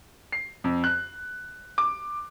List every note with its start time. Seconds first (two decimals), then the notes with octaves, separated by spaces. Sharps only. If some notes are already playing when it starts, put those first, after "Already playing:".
0.32 C7
0.64 F2
0.84 F#6
1.78 D6